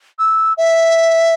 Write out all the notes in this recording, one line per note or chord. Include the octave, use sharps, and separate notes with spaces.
E6
E5